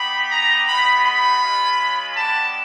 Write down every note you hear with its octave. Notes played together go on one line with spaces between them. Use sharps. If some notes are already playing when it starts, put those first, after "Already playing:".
Already playing: B3 D#4 G4 B5
A#5
G#3 B3 D#4 B5
B5
G#3 C#4 F4
B3 D4 G4 A5